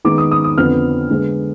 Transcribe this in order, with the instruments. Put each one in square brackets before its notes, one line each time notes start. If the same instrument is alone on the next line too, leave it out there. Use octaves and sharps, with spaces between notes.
[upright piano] D#3 G#3 B3 D#4 D6
D#6
D#6
D#6
F2 D3 F3 B3 F6
D3 G#3 B3